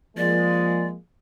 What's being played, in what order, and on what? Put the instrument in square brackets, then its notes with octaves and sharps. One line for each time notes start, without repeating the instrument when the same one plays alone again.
[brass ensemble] F3 G#3 A#3 [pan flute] D5